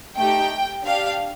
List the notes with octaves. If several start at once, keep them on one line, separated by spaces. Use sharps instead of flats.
A3 D#4 G4 G5
D4 G4 F5